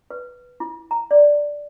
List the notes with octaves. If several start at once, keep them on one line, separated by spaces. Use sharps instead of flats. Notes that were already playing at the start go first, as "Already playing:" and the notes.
B4
E4
A#5
D5